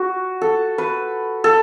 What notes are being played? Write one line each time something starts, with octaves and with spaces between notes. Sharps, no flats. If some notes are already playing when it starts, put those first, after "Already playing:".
Already playing: F#4
A4
B4
A4